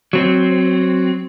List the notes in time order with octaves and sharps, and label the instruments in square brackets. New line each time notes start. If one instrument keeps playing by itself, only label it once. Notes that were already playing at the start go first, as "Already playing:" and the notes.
[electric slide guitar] F#3 C4